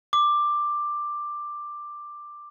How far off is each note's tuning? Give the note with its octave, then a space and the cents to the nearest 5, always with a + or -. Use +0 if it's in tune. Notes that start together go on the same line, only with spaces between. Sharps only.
D6 +10